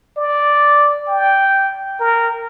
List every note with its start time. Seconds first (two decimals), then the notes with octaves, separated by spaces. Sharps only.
0.17 D5
1.08 G5
2.00 A#4